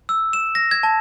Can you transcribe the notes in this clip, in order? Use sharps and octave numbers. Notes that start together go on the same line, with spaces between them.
E6
E7
A#6
G#6
A5